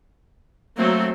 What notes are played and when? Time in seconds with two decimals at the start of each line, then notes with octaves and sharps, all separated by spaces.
0.76 F#3 A3 A#3 C4